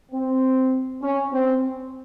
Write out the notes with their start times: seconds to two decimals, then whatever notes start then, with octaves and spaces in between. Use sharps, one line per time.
0.12 C4
1.01 C#4
1.31 C4